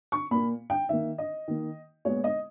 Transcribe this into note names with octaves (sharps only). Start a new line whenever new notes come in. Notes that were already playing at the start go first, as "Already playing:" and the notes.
C#6
A#2 A#3 B5
G5
D#3 A#3 E5
D#5
D#3 A#3
A#2 G#3 B3 C#5
D#5